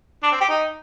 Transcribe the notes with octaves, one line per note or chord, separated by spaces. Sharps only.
D4
C4
G4
D#4